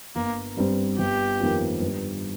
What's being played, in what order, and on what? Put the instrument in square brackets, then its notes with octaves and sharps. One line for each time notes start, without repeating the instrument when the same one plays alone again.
[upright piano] G1 [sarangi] A#3
[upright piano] G2 G3 C4 G4
[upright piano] G1 [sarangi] G4
[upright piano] F2 D#3 A#3
G2